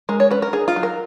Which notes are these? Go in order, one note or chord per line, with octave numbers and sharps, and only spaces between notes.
G#3 A#4
C#5
C#4 B4
A#4
D#4 G#4
F4
F#3
A#4